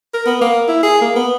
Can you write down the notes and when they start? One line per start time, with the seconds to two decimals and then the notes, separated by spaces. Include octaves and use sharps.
0.14 A#4
0.26 B3
0.41 A#3
0.68 E4
0.83 G#4
1.01 A#3
1.16 B3